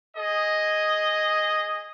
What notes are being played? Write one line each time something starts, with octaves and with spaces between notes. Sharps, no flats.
G#4 D#5